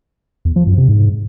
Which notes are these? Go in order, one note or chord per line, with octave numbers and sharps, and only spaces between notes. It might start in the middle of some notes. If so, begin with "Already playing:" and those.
E2
F3
F#2
C3
G#2